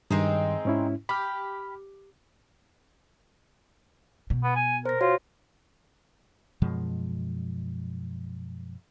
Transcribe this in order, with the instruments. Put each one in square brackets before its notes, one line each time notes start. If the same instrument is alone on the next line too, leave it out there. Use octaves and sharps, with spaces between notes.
[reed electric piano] G2 D#3 [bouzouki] G#3 C4 D#4
[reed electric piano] G#2 C#4 E4
[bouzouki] G4 [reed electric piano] B5 F6
[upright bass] B2
[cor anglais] B3
G#5
[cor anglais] A#4 [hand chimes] C5 A#6
[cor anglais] F4 [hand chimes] F#4 C#5
[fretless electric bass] F#2 B2 F3 G#3